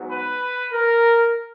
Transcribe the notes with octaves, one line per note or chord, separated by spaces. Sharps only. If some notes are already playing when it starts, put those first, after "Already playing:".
Already playing: G#2 F#3 B3
B4
A#4